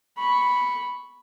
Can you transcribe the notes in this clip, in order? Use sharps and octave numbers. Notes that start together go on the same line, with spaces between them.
B5 C#6